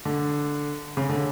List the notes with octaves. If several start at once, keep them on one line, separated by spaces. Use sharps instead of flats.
D3
C#3
D3